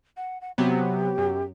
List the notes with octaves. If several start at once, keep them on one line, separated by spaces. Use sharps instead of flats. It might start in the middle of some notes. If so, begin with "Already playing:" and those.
F#5
F#5
C3 F#3 B3 G4
F#2